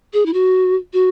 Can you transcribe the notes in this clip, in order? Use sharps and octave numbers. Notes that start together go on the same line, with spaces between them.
G#4
E4
F#4
F#4